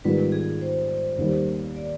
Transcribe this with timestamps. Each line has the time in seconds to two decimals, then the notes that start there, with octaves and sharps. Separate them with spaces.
0.04 G#2 D#3 G3 B3 F4 B4
0.32 G#4
0.61 C5
1.18 D#2 D#3 G3
1.76 D5